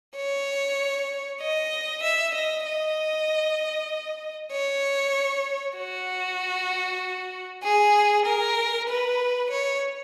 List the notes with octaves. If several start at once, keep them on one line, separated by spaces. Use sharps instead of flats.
C#5
D#5
E5
D#5
D#5
C#5
F#4
G#4
A#4
B4
C#5